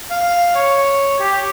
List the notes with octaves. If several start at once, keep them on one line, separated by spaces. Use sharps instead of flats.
F5
C#5
G4